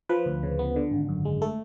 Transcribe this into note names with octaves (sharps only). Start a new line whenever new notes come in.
F3 B4
D2
C#3
B3
D3
G#1
F#2
G#3
A3 A4